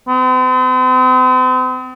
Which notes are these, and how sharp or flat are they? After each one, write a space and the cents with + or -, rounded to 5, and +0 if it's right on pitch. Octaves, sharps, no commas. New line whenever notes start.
C4 -45